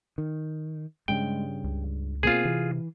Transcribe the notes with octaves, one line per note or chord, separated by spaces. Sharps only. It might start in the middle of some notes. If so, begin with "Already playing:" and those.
D#3
G2 C#3 G3 G#3 G5
C#2
B2 A#3 C4 F4 G#4
C3 E3